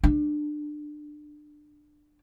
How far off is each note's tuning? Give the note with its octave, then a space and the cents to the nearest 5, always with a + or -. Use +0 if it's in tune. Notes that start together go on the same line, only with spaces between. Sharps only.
D4 +25